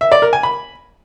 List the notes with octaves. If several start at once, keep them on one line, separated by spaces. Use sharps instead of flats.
E5
D5
A#4
G#5
B5